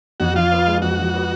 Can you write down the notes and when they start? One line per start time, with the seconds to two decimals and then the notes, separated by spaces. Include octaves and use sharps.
0.20 F2 F#4
0.35 F3 F4
0.52 B3
0.67 G#3
0.82 F2 F#4
0.98 F3
1.14 B3